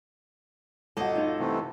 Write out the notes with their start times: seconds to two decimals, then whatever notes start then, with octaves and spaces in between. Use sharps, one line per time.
0.97 G1 F#4 A4 D#5
1.15 D#4 F4
1.40 C3 E3 A3